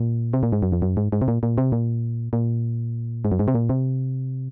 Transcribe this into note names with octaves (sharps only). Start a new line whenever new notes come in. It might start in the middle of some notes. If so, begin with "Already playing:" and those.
Already playing: A#2
C3
A#2
G#2
F#2
F2
F#2
G#2
G#2
C3
A#2
A#2
C3
A#2
A#2
G#2
F#2
G#2
C3
A#2
C3